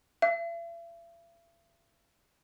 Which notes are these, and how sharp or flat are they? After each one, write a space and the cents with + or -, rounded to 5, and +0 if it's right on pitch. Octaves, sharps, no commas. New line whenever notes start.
E5 +45